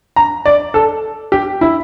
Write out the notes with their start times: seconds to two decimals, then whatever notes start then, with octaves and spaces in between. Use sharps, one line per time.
0.16 A#5
0.46 D5
0.74 A4
1.32 G4
1.61 E4